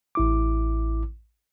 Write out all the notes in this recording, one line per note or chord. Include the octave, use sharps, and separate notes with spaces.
A1 E4 D6